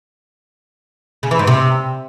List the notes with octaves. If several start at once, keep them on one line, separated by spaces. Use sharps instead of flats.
C#3
E3
G#2
C3